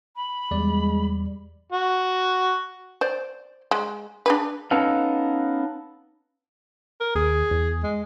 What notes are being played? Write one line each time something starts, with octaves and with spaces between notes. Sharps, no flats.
B5
E2 G3 G#3 D5
F#4
C5 D5
G#3
D4 G#4 B4
B3 C#4 D#4 A4 B4 F5
A#4
D#2 G#4
E2
G#3